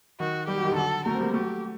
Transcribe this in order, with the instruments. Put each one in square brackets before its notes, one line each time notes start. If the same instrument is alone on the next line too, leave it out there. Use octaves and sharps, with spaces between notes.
[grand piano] D#3 [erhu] F#4
[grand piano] G3 [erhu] G4
[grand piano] F#3
D#3
D3 F#3
[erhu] A4
[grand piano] F#3 A3 [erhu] A#4
[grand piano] C4
G3 A#3
[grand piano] F#3 A3 [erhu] G4